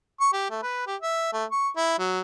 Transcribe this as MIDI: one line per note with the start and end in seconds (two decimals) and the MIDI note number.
0.20 0.29 85
0.32 0.46 67
0.50 0.59 57
0.62 0.86 71
0.87 0.96 67
1.02 1.30 76
1.33 1.44 57
1.52 1.69 85
1.76 1.96 64
1.98 2.20 54